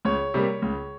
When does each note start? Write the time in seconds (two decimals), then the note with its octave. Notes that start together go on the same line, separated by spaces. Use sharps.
0.05 C#2 C#5
0.34 C3 G3 A#3
0.62 C#2